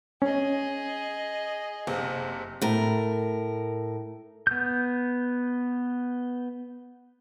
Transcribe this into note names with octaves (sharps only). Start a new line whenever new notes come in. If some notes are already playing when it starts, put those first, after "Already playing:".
C#4 G#4 D#5
F#1 C3
A2 A#4
B3 G6